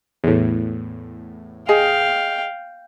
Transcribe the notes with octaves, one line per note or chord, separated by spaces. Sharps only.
E2 A2
G#4 D#5 F5 G5 G#5